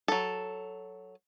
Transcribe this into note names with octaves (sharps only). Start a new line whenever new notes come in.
F#3 A4